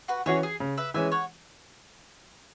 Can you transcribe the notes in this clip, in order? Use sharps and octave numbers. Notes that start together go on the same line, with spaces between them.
F#4 B4
E3 C#4 F#4 G#4 C#5
G#4
C#3
B4 E5
E3 G#3 C#4 E5 G#5
C#5 F#5